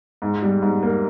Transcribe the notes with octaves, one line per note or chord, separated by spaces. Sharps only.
G#2
G3
G#2
A#3